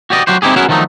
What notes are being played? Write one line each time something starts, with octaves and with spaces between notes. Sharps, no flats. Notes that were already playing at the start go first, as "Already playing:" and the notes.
F#4 G4 D5 D#5
F#3 F#4 G4 C5
C4 D#4 E4 G4 G#4
B3 C#4 E4 F#4 G#4 A#4
D#3 F3 F#3 A3 D#4